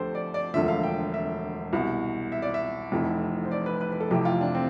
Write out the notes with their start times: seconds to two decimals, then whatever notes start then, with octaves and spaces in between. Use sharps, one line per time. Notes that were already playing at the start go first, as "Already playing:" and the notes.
Already playing: D2 D3 F3 G4 A4 C5
0.15 D5
0.34 D5
0.54 E1 D2 D3 F3 E5
0.68 F5
0.83 G5
1.14 E5
1.73 C2 B2
2.32 E5
2.42 D5
2.54 E5
2.92 F1 F2 E3
3.45 C5
3.51 D5
3.66 B4
3.81 B4
3.92 B4
4.00 A4
4.10 F1 F2 C3 E3 G4
4.25 F4
4.41 D4
4.55 C4